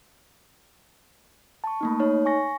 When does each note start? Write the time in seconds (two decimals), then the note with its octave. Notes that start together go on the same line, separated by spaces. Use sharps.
1.64 A5 C#6
1.81 A3 A#3 D#4
2.00 D#4 C#5
2.25 G#5 C#6 A#6